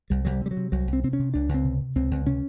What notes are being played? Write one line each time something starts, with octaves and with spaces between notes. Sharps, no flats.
C2 G3
C2 F#3
G3
C3 G3
F#3
C3
C2 F#3
C2
C4
C3 C4
C#4
C3
C#2 D4
C#2
C4
C3
C3
C#2 C4
C#2
C3 C#4